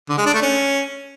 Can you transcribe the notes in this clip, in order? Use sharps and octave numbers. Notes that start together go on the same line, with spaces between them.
D3
G#3
D4
A3
C#4